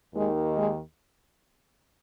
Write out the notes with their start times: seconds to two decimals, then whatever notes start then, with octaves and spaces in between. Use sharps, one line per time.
0.13 D#2 D#3 G#3
0.55 G#3